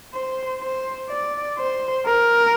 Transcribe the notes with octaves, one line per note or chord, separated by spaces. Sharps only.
C5
C5
D5
C5
A#4